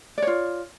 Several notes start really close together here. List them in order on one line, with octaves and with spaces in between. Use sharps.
D5 C#5 F4